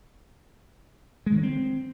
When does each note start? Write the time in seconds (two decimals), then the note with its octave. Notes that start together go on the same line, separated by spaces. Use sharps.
1.26 G#3
1.32 D#3
1.37 C#4
1.43 C4